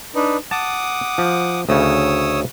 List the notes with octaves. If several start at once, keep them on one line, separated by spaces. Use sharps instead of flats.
D4 D#4 B4
F#5 A5 D6 D#6
F3
D2 C#3 C#5 D#6 E6